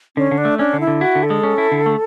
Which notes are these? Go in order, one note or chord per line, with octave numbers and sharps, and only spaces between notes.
D3 C#4
D3
D4
A3
C#4 D4
D3
E4
D3
E4 F#4
D3
A4
G#3
C#4
E4
D3
A3